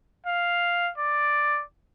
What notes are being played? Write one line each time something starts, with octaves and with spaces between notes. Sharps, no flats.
F5
D5